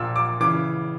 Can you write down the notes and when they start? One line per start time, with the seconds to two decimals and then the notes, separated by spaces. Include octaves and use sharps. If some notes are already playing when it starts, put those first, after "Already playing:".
Already playing: A#1 A#2 E6
0.16 D6
0.40 C#3 E3 D6